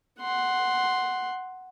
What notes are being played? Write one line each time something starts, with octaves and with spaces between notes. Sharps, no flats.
F#5 C6